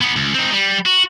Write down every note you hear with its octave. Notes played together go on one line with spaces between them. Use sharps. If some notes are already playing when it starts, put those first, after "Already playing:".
B3 D#4
C#2
C4 D#4
G3
F#4